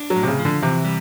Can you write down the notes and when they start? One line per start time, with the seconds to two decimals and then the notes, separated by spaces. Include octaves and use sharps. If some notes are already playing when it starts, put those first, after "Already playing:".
Already playing: D4
0.10 F#3
0.16 A2
0.23 C3
0.27 C#3
0.39 F3
0.45 D3
0.62 C3 E3
0.85 G3